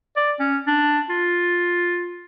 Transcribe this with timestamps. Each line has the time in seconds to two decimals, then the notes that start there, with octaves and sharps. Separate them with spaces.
0.16 D5
0.40 C#4
0.67 D4
1.09 F4